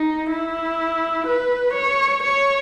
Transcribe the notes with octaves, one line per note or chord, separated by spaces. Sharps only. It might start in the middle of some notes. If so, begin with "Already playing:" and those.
Already playing: D#4
E4
B4
C#5
C#5